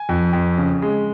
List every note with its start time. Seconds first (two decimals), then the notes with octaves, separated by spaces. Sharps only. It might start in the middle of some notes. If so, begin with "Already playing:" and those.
Already playing: G#5
0.09 F2
0.33 F2
0.58 C#3
0.82 G#3